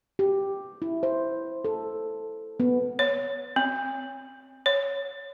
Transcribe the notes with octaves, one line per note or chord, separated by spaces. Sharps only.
G4
E4
C5
A4
B3
C#5
C4
C#5